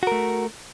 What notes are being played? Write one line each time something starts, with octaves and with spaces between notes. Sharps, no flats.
A3 F#4 A#4